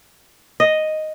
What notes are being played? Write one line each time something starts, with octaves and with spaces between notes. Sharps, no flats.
D#5